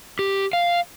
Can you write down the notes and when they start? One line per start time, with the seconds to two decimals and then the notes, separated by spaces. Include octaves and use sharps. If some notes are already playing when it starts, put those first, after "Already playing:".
0.19 G4
0.53 F5